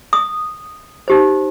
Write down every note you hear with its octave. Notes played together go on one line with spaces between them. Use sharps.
D#6
D#4 G4 C5